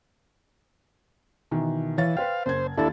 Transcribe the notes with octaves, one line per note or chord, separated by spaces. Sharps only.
B2 D#3 E3
E3 C#5 F5 A6
B4 C5 F5 G5
F#1 C5 G#6
D#2 D4 E4 A4 A6